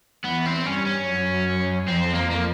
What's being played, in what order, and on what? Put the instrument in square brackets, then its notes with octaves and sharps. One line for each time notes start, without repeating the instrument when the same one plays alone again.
[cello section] E2 E3 [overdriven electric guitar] B3
[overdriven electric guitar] C4
[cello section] G2 G3 [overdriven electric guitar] C#4
[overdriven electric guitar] C#4
[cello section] F#2 F#3
[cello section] F2 F3 [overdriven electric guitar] C4
[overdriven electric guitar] A#3
A#3